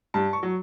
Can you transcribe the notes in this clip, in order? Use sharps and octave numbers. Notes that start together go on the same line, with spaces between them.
G2 A5
C#6
F#3